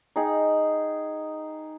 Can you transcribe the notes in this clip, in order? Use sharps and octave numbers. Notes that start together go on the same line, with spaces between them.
D#4 G#4 G5